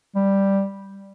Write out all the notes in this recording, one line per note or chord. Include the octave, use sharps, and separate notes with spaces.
G3